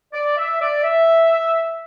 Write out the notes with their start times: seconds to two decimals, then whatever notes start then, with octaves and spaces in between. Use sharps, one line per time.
0.13 D5
0.37 E5
0.61 D5
0.84 E5